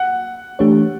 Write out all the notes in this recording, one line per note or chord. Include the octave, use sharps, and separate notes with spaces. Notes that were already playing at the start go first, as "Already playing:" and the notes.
Already playing: F#5
E3 A3 D4 G4 C#5